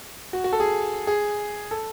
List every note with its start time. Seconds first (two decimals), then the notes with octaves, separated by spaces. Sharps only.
0.33 F#4
0.44 F#4
0.53 A4
0.60 G#4
1.07 G#4
1.71 A4